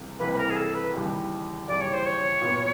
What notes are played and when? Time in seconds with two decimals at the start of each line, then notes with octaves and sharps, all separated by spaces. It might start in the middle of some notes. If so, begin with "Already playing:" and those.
Already playing: C#2 C3 E3 G3 A#3
0.19 C#2 C3 E3 G3 A#3 B4
0.33 B4
0.38 A#4
0.50 G#4
0.56 A4
0.75 B4
0.93 D#2 C#3 E3 G3
1.68 D#2 C#3 E3 G3 D5
1.81 C#5
1.94 C5
2.06 C#5
2.42 A#2 F#3 B3